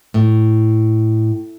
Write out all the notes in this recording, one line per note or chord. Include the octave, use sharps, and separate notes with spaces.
A2